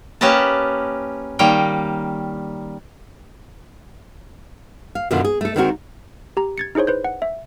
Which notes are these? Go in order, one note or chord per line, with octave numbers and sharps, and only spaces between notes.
A#3 C#4 G4 B4 D#5 A5
D#3 G3 A#3 G5
F5
F#2 B2 D3 D#3 F4
G#4
A3 A4
D#3 G#3 C4 E4 F#4 A#4
G4 A#5
G#6 A6 C#7
D#4 E4 G#4 C5 C#5
B4 C5 G6
F#5
E5